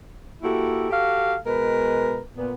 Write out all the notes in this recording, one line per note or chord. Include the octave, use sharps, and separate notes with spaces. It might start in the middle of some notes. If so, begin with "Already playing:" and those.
A#3 E4 F#4 G4 A4
F#4 G4 A4 F5
B2 G#3 A#4 B4
A#2 B3